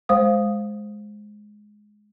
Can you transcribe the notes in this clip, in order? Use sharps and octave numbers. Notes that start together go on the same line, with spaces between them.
G#3 C5 F5 D#6